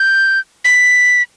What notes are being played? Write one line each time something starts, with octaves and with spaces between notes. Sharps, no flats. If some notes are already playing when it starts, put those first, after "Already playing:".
Already playing: G6
B6